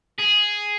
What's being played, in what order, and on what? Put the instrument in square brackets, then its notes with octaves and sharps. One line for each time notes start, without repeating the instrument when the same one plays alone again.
[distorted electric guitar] G#4